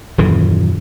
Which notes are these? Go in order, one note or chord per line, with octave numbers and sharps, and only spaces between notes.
D#1 F#2 E3